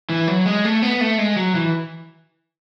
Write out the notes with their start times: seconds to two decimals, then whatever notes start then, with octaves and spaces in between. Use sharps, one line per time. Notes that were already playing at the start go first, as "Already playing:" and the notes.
0.10 E3
0.28 F#3
0.46 G#3
0.65 A3
0.82 B3
1.01 A3
1.18 G#3
1.36 F#3
1.55 E3